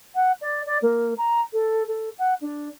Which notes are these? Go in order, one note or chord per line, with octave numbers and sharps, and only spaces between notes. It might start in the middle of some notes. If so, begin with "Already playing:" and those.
F#5
D5
D5
A#3
A#5
A4
A4
F#5
D4